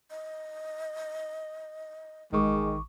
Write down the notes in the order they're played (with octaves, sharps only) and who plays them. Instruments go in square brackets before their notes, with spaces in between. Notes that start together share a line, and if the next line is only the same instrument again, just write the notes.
[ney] D#5
[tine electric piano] A1 C#6 D6 [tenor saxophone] D#3 [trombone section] G#3